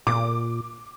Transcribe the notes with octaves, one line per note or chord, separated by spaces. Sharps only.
A#2 D6